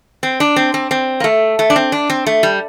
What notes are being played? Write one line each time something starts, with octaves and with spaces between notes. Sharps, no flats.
C4
D4
C4
C4
C4
A#3
A3
A3
D4
C4
D4
C4
A3
G3